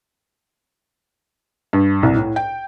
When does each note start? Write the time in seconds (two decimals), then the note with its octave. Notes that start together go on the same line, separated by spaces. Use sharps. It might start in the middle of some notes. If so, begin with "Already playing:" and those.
1.73 G2
2.03 C2
2.16 A2
2.36 G5